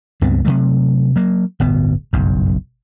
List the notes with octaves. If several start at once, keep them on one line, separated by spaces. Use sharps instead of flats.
C#2 G2 B3 C4
C3 F3 F#3 A3
F#3 A#3
D1 G1 B2 B3
F#1 B1 G2